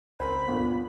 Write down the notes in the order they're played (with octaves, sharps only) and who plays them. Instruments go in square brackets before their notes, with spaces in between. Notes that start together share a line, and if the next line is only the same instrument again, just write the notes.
[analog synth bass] C#2 [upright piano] C4 A#4 C5 [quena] B5
[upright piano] G1 A#2 F3 [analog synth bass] B3